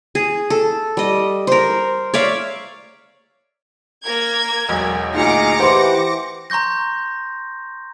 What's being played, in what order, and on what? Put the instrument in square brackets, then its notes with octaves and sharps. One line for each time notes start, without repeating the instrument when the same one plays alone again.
[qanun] G#4
A4
G3 D#5
A#4 C5
C#5 D5 E5 F5
[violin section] A#3 A#4 G#6
[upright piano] E1 B1
[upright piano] D2 A#2 [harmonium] D#4 G#4 F5 [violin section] D6 A#6 C#7
[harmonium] E3 G4 F#5 [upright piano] C5 C6
[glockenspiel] A#5 C6 C#6 G6 A#6